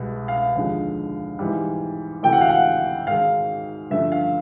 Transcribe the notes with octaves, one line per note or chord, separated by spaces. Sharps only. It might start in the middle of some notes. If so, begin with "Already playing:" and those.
Already playing: C2 B2 G#3
F5
D#2 D3 F3 G#3
G#2 E3 G3
D2 C3 E3 A3 G5
F#5
F5
F#5
G#2 D#3 G#3 F5
G2 D3 F3 A3 E5
F5